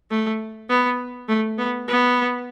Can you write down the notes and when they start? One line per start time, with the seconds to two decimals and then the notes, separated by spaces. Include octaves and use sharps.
0.10 A3
0.69 B3
1.29 A3
1.58 B3
1.88 B3